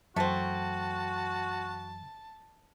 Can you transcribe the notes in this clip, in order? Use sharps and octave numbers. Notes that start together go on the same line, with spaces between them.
F#2 E3 F#3 A3 C4 F#4 A5